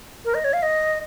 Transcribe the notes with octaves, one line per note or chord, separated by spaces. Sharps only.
A#4
D#5
C#5
F5
D#5